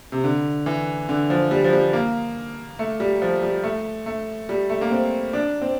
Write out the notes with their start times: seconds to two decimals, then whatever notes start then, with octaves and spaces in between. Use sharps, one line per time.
0.12 C3
0.24 D3
0.66 E3
1.09 D3
1.30 F3
1.51 G3
1.64 F3
1.73 G3
1.93 A#3
2.79 A3
3.00 G3
3.22 F3
3.43 G3
3.64 A3
4.06 A3
4.49 G3
4.70 A3
4.81 A#3
4.91 C4
5.33 D4
5.61 C4